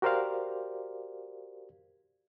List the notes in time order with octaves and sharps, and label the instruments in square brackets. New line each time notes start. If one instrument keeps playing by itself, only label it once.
[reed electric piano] F#4 G4 A#4 C5 D5 F5